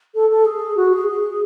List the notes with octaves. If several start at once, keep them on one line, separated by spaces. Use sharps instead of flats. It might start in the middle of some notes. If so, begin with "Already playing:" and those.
A4
A4
G#4
F#4
G#4
G#4